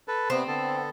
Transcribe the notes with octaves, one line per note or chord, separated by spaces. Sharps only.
A4 B4
C3 B3 C4
D3 B3 A4